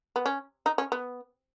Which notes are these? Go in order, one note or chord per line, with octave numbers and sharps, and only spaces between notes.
B3
C#4
D#4
C#4
B3